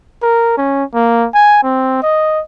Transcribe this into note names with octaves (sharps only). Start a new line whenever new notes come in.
A#4
C#4
A#3
G#5
C4
D#5